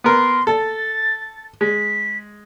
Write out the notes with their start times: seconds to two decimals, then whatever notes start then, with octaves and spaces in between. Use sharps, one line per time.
0.04 B3 A#4 C6
0.47 A4 A6
1.61 G#3 B6